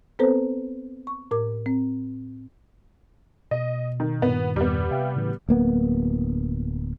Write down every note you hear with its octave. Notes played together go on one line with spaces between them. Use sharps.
B3 C4 A4 B4 C5
C#6
A2 A#4 D6
C4
B2 D#5
D#3
G2 A#2 D#3 B3
E2 G3 B3
C3 E5 F5 G5
A2 C#3 E3
D1 A#3 B3